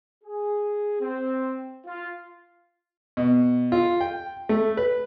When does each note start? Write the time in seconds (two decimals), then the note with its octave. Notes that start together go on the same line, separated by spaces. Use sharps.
0.24 G#4
1.01 C4
1.86 F4
3.17 B2
3.72 F4
4.01 G5
4.49 A3
4.77 B4